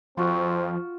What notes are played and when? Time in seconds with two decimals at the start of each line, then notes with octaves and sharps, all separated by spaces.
0.17 F2 F3 C4 F4 F#4